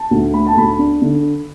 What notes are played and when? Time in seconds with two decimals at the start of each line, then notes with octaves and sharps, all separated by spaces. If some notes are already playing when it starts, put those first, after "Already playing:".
Already playing: A5
0.11 D2
0.33 A3 B5
0.46 A5
0.57 D2 B5
0.79 D4
1.02 D3